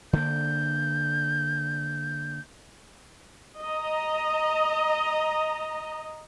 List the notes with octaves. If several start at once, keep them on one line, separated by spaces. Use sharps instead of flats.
D3 A#3 G6
D#5 A#5